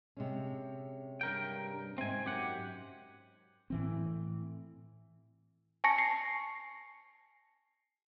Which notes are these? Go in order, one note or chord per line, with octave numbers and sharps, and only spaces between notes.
C3 G#3 C#4
G2 A#4 G5
G#2 C4 E5 G#5
F#2 G4 F#5
A2 E3 C4
G#5 A5 C#6 A#6 C#7
C7